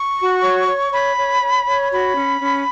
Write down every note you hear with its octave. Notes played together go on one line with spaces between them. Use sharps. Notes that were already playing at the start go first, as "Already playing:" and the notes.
Already playing: C#6
F#4
C#5
C#5
C#5 B5
C#5
C#5
C#5
F#4 B5
C#4
C#4